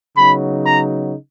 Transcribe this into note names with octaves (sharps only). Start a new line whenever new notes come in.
C#3 F#3 B3 D#4 B5
A#5